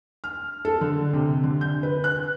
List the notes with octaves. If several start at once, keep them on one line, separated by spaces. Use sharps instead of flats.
F6
A4
D3
C3
D3
G6
B4
F#6